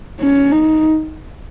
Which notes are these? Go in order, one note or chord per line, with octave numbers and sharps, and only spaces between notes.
C#4
D#4